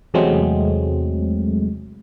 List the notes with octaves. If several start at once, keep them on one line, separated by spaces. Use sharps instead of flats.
E2 C3 F#3 G#3 A3 C4